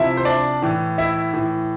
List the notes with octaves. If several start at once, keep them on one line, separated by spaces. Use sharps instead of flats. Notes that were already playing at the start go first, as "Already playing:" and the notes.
Already playing: C3 F3 E4 E5
C5
D4 D5
A2 E3
E4 E5
A2 E3